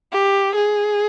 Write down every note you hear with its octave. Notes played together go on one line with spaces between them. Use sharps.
G4
G#4